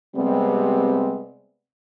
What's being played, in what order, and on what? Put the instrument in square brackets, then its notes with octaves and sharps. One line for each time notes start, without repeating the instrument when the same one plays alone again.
[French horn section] C3 G3 G#3 B3 C4